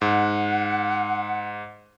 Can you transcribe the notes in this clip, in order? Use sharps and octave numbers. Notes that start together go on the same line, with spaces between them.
G#2 F#5